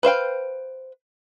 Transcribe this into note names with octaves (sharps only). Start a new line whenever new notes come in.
B4 C5 F5 G5